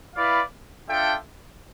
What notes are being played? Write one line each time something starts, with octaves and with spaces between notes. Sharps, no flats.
E4 B4 D5 F5
D4 F4 A4 E5 G5